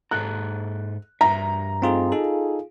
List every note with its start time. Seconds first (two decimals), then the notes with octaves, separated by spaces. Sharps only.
0.11 G#2 A4 A#5 F#6
1.21 G2 E5 A#5
1.82 A3 C4 D#4 F4 G#4
2.12 D#4 F4 G#4 A4